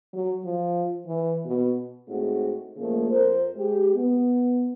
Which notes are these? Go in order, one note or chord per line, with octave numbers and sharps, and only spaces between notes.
F#3
F3
E3
B2
A2 G#3 C4 D#4 F#4 A4
A#2 C#3 F3 A3 A#3
F2 A#4 C5
G#3 G4
B3